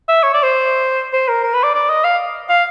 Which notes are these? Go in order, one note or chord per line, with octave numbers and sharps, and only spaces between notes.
E5
C#5
D5
C5
C5
A#4
A#4
B4
D5
D5
D#5
F5
F5